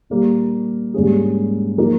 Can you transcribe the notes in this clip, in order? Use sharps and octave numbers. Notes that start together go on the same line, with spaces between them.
A#2 G3 A#3
G#2 G3 A#3 C#4 G#4
F3 A#3 D#4 A#4